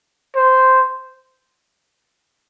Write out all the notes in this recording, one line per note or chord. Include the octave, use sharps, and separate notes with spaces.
C5